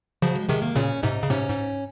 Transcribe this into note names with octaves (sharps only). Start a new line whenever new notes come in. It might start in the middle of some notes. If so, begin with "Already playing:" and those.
C#3 F3 F#3
G#3
C3 D#3 G#3
A#3
A#2 C#3 C#4
G#2 C3 D#4
C#3
G#2 C3 C#4
G#2